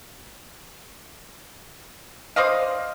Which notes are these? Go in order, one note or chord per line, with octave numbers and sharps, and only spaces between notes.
C5 D5 D#5 F5